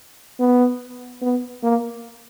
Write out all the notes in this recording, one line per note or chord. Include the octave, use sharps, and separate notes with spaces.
B3
B3
A#3